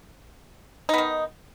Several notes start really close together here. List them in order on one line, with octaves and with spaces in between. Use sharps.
D#4 B3 D#3